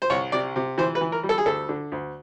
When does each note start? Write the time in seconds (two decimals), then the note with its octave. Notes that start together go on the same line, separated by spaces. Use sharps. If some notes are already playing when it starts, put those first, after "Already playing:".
0.02 C5
0.10 C2 C#5
0.32 C3 D5
0.56 C3
0.78 E3 C5
0.95 B4
1.01 E3
1.12 A#4
1.23 G3
1.29 A4
1.38 G#4
1.46 D2 A4
1.69 D3
1.92 D2